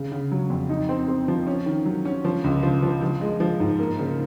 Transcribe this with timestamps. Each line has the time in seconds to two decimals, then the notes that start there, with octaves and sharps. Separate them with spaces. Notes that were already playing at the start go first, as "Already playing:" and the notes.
Already playing: C#3
0.12 C#3
0.32 F#3
0.50 F2
0.69 D#4
0.89 C4
1.08 C4
1.28 F3
1.47 C#4
1.66 D#3
1.86 F#3
2.05 C#4
2.25 F3
2.44 C#2
2.63 F3
2.83 F3
3.02 F3
3.21 G#3
3.40 F3
3.60 G#2
3.79 A#3
3.99 C#3